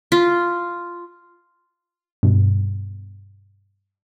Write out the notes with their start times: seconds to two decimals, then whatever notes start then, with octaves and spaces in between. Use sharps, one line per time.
0.12 F4
2.23 G2 B2